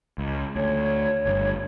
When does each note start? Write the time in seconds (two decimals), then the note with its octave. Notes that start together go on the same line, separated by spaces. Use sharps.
0.18 C#2
0.56 D2 C#5
1.26 G1 G2